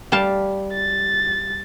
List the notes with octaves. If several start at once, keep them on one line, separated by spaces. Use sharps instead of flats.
G3 F5 A5
A6